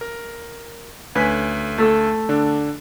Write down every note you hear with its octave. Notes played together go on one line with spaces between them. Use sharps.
A#4
D2 C#4 B4 G#5 B6
A3 A4 E6
D3 D4